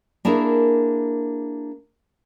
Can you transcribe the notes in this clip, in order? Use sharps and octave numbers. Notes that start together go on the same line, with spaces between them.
A#3 D4 E4 G#4 A#4